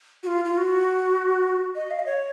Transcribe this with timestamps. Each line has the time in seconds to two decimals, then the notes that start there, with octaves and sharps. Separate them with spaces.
0.23 F#4
0.27 F4
0.45 F4
0.58 F#4
1.75 D#5
1.91 F5
1.99 D#5
2.06 C#5